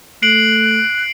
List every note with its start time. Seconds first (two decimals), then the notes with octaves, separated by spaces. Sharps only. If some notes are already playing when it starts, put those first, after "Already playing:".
0.22 A3 F#6 C7 D7 F#7